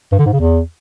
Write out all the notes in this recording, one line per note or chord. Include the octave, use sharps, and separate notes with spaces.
G2
D3
G#2
C#3
E2